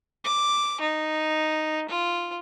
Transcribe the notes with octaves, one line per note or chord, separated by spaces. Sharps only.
D6
D#4
F4